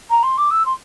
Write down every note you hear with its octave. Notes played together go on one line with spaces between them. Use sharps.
A#5
C6
D6
E6
C6